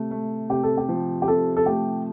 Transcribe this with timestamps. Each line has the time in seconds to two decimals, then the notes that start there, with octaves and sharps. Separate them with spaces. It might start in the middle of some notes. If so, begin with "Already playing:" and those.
Already playing: C3 A3
0.11 A3
0.49 C3 G4
0.63 A4
0.77 G4
0.89 F3
1.22 G4
1.27 C3 A4
1.57 A4
1.66 A3 G4